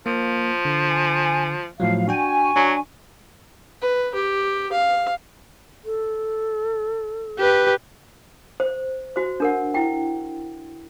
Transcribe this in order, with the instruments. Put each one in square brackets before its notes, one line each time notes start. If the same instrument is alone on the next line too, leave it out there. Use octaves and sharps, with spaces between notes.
[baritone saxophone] F3 [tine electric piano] A#3
[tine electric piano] D3
[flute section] G#5
[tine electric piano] A2 F3 F#3 [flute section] F5
[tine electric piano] D4 F#4 G5 [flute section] G#5 C#6
[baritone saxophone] F#3 [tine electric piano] D4
[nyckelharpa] B4
G4
F5
[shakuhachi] A4
[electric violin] G4 B4
[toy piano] C5
F#4 C5
D4 A#4 F#5
E4 G5